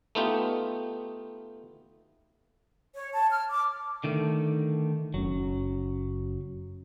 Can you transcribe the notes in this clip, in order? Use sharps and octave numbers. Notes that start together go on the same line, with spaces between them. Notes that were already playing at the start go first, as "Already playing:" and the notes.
A3 B3 D#4 F4 G4
C#5
A5
F6
D6
D3 D#3 A3
F#1 F#3 C#4